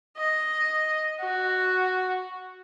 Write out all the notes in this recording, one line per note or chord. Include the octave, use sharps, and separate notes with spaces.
D#5
F#4